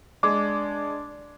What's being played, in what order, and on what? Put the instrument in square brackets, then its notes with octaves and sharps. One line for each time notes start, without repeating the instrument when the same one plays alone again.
[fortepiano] G#3 [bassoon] D4 [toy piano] D6